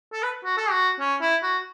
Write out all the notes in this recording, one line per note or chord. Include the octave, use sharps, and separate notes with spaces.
A4
B4
F#4
A4
F#4
C#4
E4
F#4